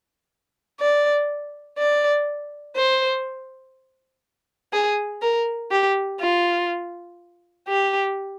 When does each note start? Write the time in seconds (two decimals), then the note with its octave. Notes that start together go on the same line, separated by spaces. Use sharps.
0.80 D5
1.78 D5
2.76 C5
4.73 G#4
5.22 A#4
5.71 G4
6.21 F4
7.68 G4